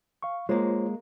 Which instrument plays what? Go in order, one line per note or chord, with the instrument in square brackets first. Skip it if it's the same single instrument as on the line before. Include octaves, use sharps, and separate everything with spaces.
[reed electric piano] F5 C#6
[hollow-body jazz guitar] G#3 A#3 [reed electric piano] F4 C5 C#5